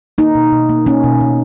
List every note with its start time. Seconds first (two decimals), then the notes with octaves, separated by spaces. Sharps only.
0.18 A#3 D#4
0.35 B2
0.52 B2
0.69 A#3
0.86 A#3 C#4
1.04 B2
1.21 B2